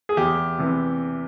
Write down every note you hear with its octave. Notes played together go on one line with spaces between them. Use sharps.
G#4
E2 G4
C3 E3